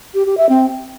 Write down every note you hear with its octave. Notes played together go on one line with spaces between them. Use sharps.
G4
G4
E5
C4